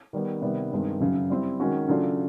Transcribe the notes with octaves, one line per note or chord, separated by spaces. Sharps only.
D#3 G3 B3
C3 D#3 G3 B3
G2 D#3 G#3 C4
F#2 C#3 F#3
G3 C4 E4
D#3 G#3 C#4 F#4
C#3 F#3 A3 D4 F4